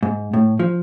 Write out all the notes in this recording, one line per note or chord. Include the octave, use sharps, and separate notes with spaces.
G#2
A2
F3